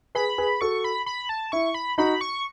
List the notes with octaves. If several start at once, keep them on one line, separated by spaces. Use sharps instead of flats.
G#4 B4 B5
G#4 B4
F#4 A4 C#6
B5
B5
A5
E4 C#6
B5
D#4 F#4 B5
C#6